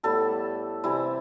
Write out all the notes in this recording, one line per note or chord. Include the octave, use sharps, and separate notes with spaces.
A2 G3 B3 A4
C3 E3 G3 C4 E4